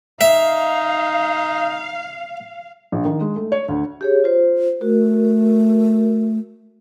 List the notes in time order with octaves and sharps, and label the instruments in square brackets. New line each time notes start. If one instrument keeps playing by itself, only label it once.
[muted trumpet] D#4 [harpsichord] E5 [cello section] F5
[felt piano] A#1
D#3
G#3
A3
C#5
D2
[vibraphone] G4 G#4 C#5
F4 C5
[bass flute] A3 [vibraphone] F#4 A#4